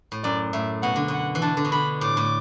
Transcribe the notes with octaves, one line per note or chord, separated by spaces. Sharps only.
A2
F#2 D5
A2 E5
B2 F#5
D3
B2 F#5
E3
D3 A5
D3
B2
D3 B5
A2 D6
A2